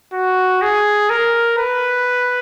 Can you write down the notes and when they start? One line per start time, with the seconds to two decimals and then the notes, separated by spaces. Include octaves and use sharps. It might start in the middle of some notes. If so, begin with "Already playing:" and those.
0.14 F#4
0.62 G#4
1.10 A#4
1.58 B4